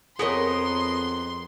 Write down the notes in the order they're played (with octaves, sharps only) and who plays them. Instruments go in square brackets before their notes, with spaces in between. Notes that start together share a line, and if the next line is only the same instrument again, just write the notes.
[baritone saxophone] F2 [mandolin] B3 A#4 D#5 [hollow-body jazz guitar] G#4 C#5 [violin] C6